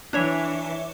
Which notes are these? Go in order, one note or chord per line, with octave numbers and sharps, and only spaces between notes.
E3 D4 C#5 E5